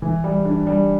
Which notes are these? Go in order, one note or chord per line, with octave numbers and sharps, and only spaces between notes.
E3
G3
D4
G3